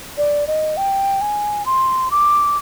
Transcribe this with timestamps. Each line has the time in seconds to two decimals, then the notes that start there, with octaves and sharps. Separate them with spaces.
0.18 D5
0.47 D#5
0.77 G5
1.21 G#5
1.66 C6
2.11 D6